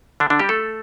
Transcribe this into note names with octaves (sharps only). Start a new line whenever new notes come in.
D3 D4
D3 D4
G3 G4
A3 A4